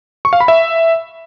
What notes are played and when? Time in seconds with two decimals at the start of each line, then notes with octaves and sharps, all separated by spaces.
0.25 C#6
0.33 F5
0.40 B5
0.48 E5